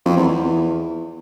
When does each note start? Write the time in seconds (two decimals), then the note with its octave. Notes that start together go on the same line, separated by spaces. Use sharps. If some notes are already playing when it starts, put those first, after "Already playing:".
0.06 F2
0.17 E2
0.28 E2